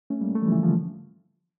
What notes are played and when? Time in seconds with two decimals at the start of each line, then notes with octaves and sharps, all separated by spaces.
0.10 A3 C#4
0.21 G3 A#3
0.35 A3
0.42 E3 G3
0.48 F3
0.52 C#3 E3
0.62 D3 F3